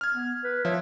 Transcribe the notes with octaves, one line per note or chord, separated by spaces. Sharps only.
F6 G#6
B3
B4
F3 C#5 E5